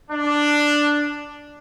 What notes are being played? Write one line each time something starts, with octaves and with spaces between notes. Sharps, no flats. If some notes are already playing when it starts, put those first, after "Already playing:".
D4